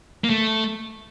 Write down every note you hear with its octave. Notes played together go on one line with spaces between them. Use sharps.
A#3
A3